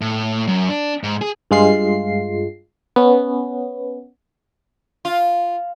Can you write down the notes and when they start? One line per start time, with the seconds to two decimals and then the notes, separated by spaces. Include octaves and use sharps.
0.01 A2
0.47 F#2
0.69 D4
1.03 G#2
1.21 G#4
1.51 G2 G#3 F4 C7
2.96 B3 C#4
5.05 F4